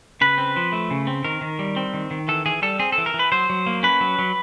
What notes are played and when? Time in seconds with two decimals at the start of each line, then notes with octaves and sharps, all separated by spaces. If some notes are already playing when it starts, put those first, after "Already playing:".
0.21 C#3 B4
0.38 C4
0.56 F3
0.72 A3
0.90 C#3
1.07 C4
1.24 D#3 A#4
1.41 D#3
1.59 G3
1.76 C4
1.94 D#3
2.11 D#3
2.28 E3 A4
2.46 E3 G#4
2.62 G3 A4
2.79 C4 G#4
2.92 A4
2.98 E3
3.06 A#4
3.14 E3
3.19 B4
3.32 F#3 C5
3.50 F#3
3.67 A#3
3.83 C#4 B4
4.01 F#3
4.19 F#3